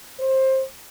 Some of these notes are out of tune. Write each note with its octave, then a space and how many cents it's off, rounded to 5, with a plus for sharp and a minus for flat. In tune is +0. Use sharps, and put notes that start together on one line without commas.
C5 +20